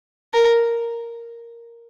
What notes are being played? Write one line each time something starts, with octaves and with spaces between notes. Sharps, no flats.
A#4